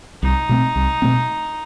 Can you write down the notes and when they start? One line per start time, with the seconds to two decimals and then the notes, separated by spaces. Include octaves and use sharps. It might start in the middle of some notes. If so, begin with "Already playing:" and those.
0.23 C2 D#4
0.49 B2 A3 C4
0.76 C2
1.02 B2 A3 C4